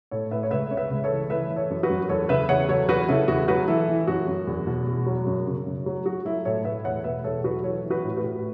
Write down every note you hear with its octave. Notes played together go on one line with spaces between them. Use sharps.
A2 A4 C#5
A2 B4 E5
C#5
C#2 B4 E5
C#3 C#5
B4 E5
C#2
A4 C#5
E3
E3 B4 E5
E3
A4 C#5
F#2
F#4 B4
F#2
E2 A4 C#5
C#3 B4 E5
E2 C#5 F#5
F#3 A4 C#5
E2 F#4 B4
C#3 E4 A4
E2 F#4
F#3 F#4 B4
E3 E4 A4
E3
F#2 F#4
F#2
E2
B2
E2
F#3
F#2
C#3
F#2
F#3
F#3 F#4
F#3 E4 A4
A2 A4 C#5
A2 B4 E5
E2 C#5 F#5
B2 B4 E5
E2 A4 C#5
F#3 F#4 B4
E3 A4 C#5
E3
F#4 B4
A2
F#4 B4
A2